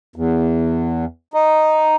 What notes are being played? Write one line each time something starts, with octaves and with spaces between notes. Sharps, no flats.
E2
D#4